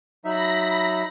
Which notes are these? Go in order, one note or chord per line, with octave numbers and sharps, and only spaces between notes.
F#3 D#4 E5 B5 A#6